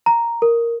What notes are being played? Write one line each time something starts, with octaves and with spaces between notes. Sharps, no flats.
A#5
A#4